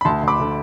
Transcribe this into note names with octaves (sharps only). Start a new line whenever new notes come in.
B5
D2 A5 C6
D2 B5 D6
D3